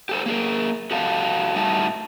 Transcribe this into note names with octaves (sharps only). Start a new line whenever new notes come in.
G4 A4 C5
A#3 G#4 A#4
F#4 G4 A4 F5
A2 G3 D#4 F#4 E5 A5